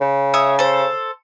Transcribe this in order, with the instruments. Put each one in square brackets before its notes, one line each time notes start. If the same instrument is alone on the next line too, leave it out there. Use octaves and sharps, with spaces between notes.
[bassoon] C#3
[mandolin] C#5 E5 D#6
A4 C5